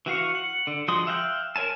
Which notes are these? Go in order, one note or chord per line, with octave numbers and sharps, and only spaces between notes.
E3 F#4 F5 C#6
F#5
D3
F3 G#3 F#4 C6 D#6
E5 F5 G5 A5 F#6
A#4 C#5 G#5 A5